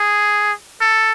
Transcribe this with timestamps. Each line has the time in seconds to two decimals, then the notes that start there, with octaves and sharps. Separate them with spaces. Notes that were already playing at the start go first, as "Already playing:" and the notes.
Already playing: G#4
0.81 A4